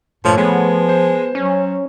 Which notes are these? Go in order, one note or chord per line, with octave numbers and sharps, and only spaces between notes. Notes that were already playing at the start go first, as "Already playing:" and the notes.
G2 A#2 F3 A3 C#5
F3 G#3 B3
C5
F#3 C#4